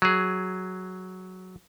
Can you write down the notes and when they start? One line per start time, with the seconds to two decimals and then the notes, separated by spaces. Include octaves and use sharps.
0.02 F#3 G#4